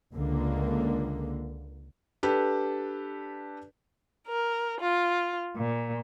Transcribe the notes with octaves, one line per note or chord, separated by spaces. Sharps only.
C#2 D3 A#3
D4 G4 A4 B4
A#4
F4
A#2